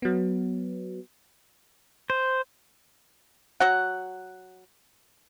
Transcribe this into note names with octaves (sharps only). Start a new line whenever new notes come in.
F#3 B3
C5
F#3 F#4 F#5